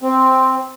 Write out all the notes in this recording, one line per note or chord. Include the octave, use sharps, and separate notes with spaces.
C4